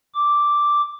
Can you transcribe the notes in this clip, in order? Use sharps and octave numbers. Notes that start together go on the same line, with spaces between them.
D6